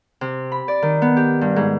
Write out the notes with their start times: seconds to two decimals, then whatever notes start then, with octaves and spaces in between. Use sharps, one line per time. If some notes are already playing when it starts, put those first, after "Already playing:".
0.21 C3
0.52 B5
0.68 D5
0.82 D#3
1.02 B3
1.17 G4
1.41 G2
1.56 G#2